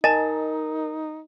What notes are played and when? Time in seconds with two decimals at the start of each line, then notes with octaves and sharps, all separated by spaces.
0.04 D#4 A#4 D#5 G#5 A5